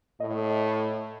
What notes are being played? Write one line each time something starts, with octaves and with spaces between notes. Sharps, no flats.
A2 D#5